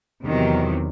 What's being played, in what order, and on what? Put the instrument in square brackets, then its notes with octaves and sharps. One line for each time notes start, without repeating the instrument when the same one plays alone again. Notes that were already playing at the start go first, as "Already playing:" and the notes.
[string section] E2 C3 D#3 F#3